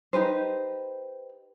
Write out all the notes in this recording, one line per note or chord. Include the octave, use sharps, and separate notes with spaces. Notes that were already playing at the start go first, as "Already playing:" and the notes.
D#4 G4 B4 C5